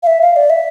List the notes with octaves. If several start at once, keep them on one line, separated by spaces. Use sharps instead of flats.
F5
E5
F5
D5
E5